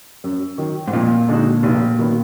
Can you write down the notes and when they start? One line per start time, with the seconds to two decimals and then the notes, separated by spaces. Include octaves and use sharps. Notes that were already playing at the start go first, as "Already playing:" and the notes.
0.24 F#2
0.58 D#3 F#3
0.88 G#2
0.93 F2 A#2
1.28 D3 G#3 D#4 F#4
1.63 F1
1.99 D#3 F#3 B3